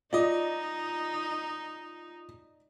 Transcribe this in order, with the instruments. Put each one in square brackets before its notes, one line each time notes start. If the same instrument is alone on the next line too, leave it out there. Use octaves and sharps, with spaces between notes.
[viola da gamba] D#4 [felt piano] F4 [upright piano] D5 D#5